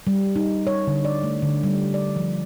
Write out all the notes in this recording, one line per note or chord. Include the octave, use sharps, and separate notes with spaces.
G3
D#4
C#5
D3
D5
A3
D3
G3
D5
F3